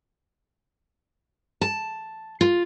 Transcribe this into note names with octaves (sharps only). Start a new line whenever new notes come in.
A5
F4